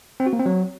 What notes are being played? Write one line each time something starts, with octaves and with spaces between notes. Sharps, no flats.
C4
F#4
A#3
C4
F#3